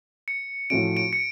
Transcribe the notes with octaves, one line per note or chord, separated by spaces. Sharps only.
C#7
A2 F3 A3 C#4 F#4 D7
D7
C#7